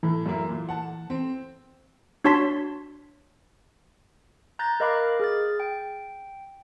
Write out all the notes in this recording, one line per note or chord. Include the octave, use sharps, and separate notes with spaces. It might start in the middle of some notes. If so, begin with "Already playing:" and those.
A2 E3
F#2 A#3 E4
A#2
F#5 A5
C4
D4 F#4 C#5 A5 C6 B6
A#5 F#6 G6 A6 A#6
A#4 D#5 F5 B5 D6 F#6
G#4 F6 A6
G5